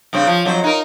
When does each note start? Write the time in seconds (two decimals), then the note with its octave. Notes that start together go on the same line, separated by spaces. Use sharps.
0.13 G2 C#3 C4
0.27 F3
0.45 F2 F#3 C5
0.64 D#4 A#4